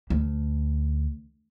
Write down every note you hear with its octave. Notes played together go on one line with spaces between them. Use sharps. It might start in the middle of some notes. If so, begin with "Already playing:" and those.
D2